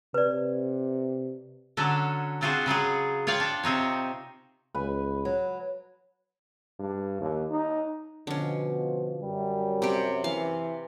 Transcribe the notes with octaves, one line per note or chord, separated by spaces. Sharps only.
C3 B4 D5
D3 F#3 C#4 D4 A4
C4 D4 F4 F#4 G#4 C5
C#3 F#3 F4 G#4
F4 C#5 D5 F5 G5
D4
C3 C4 D#4 C#5
C#2 B4 G#5
F#3
G2
D#2
D#4
B2 D3 F3 C#4
F#2 G3
C3 G4
E3 F5